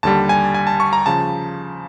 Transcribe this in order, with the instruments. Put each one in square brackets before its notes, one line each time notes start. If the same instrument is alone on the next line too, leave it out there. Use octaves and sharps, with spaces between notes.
[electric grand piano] D#2 D3 G3 A5
G#5
G#5
A5
C#6
A#5
C#3 F3 A5